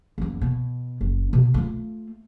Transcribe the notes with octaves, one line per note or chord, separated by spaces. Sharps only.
F#1 E2
B2
F#1
B2
A3 F4